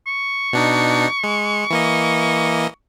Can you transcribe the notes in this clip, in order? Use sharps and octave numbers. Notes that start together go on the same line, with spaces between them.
C#6
B2 D4 D#4
G#3
E3 A#3 D#5